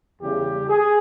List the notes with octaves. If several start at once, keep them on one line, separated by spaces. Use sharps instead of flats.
E2 C#3 G3 G4
G#4